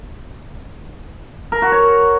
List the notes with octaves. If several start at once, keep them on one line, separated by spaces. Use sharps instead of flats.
A#4
F#4
C#5